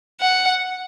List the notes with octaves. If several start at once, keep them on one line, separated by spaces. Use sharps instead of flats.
F#5